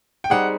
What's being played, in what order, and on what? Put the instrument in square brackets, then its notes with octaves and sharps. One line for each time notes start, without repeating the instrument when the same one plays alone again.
[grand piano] G5
[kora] G3 C4 D#4 G#4 [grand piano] F#5